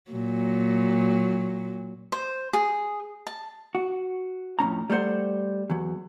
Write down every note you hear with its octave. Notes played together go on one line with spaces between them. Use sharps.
A#2 F#3
C5
G#4
A5
F#4
F2 A2 C#4 A#5
G3 A3 B3 C5 F#5
E2 F#3